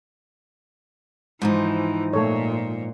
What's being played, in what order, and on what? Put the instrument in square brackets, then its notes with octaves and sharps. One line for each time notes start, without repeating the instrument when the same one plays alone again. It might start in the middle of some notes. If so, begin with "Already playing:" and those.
[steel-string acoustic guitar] G#2 F3 D#4 [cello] E3
[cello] A#2 [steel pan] A3 A4 C#5